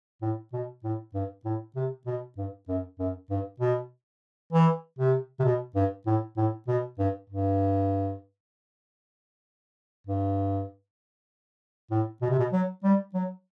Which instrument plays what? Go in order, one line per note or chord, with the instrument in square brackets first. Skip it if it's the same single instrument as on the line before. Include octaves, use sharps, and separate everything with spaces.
[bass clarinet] A2
B2
A2
G2
A2
C3
B2
G2
F#2
F#2
G2
B2
E3
C3
C3
B2
G2
A2
A2
B2
G2
G2
G2
A2
B2
C3
B2
F#3
G3
F#3